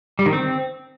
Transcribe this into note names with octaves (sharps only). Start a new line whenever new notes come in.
G3
D#3
C4